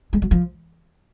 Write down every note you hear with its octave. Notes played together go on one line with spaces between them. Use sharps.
G#3
F#3
F3